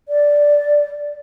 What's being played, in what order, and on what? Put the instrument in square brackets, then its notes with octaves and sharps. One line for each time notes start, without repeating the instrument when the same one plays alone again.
[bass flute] D5